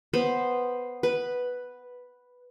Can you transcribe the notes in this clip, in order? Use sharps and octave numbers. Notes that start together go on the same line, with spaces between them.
B3 C5 B5
B4